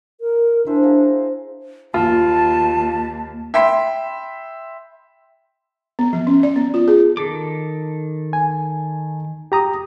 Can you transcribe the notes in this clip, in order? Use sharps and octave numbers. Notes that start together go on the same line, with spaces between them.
A#4
D4 E4 C5 G#5
G#4 A#4 F5
D#2 F4 A5
E5 G5 B5 C6 B6
B3
F3
C#4
D5
B3
F4
G#4
D#3 A4 D6
G#5
G4 A#5 D#6